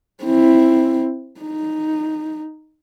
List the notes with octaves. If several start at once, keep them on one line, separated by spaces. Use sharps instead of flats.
C4 E4
D#4